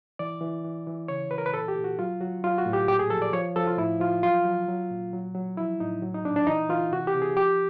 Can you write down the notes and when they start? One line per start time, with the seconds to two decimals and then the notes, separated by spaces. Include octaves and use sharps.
0.19 E3 D5
0.41 E3
0.65 E3
0.87 E3
1.08 C#3 C#5
1.31 E3 B4
1.38 A#4
1.46 B4
1.53 A#2 A4
1.68 G4
1.76 A#2
1.84 F#4
1.99 F#3 F4
2.21 F#3 F#4
2.44 F#3 F4
2.58 F#4
2.66 A2
2.73 G4
2.88 A#2 G4
2.99 G#4
3.10 F3 A4
3.22 D5
3.33 F3 C#5
3.56 F3 A4
3.67 F4
3.78 A2 E4
4.00 F3 F4
4.23 F#3 F4
4.45 F#3
4.68 F#3
4.91 A#2
5.13 F#3
5.35 F#3
5.57 F3 E4
5.80 A2 D#4
6.02 F#3
6.14 D#4
6.25 A#2 D4
6.36 D4
6.47 E3 D#4
6.69 E3 F4
6.92 C3 F#4
7.07 G4
7.15 C3
7.22 G#4
7.37 F3 G4